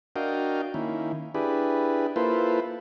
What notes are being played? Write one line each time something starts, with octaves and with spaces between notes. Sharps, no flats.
D4 F#4 A#4 D#5 F5 G5
D#3 A#3 C#4 E4
D4 E4 G4 G#4 B4
A#3 E4 F4 A4 B4 C5